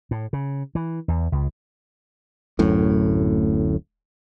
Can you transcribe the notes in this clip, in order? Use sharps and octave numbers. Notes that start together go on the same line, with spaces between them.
A2
C#3
E3
E2
C#2
D1 F#2 A2